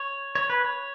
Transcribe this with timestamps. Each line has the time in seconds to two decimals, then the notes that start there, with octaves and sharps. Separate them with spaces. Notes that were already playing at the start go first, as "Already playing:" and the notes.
Already playing: C#5
0.35 C#5
0.50 B4
0.64 C#5